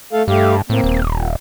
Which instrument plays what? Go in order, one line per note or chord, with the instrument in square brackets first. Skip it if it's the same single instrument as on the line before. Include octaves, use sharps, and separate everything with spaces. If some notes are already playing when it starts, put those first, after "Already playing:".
[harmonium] A3 A4 F5
[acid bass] G2 [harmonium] A3 G4 F5
[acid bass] A2 [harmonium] A#3 C4
[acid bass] D#1
[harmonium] A#2